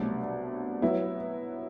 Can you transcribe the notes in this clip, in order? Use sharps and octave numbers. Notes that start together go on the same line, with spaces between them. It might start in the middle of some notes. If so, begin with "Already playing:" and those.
Already playing: C2 B2 F#3 A3 D4
F#3 B3 E4